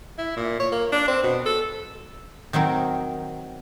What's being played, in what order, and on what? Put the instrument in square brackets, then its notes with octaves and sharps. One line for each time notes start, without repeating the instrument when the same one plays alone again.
[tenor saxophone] E4
A#2
C#5
A#3
D4
C4
B2
A4
[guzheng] D#3 F#3 C4 A#4